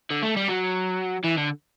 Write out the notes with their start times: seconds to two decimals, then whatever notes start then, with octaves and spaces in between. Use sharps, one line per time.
0.10 D3
0.22 A3
0.36 G3
0.48 F#3
1.24 E3
1.37 D3